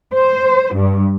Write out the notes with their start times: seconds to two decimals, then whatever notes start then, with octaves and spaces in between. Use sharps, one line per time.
0.14 C5
0.76 G2